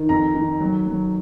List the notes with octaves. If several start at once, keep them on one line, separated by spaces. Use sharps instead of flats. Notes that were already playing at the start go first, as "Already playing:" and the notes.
Already playing: D#3
F2 A#5
D#3
F#3
F#3